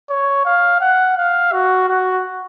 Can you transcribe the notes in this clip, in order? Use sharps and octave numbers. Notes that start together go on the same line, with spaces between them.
C#5
F5
F#5
F5
F#4
F#4